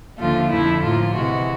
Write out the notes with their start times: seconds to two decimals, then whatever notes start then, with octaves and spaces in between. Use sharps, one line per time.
0.18 D#2 D3 F3 A3 F4
0.50 F2 D3 F3 A3 E4
0.82 A2 F3 A#3 F4
1.15 C3 E3 G#3 F#4